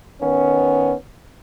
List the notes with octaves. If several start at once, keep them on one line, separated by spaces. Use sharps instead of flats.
D#3 B3 C#4